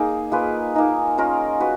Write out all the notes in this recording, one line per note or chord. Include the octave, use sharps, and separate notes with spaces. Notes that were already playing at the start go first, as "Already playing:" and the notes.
Already playing: A#3 D#4 G#4
A#3 F4 G#4 B4
A#3 D#4 A#4
C#4 F4 A#4 D#5
F#4 B4